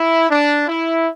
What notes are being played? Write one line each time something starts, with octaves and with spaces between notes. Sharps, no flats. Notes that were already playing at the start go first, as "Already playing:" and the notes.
Already playing: E4
D4
E4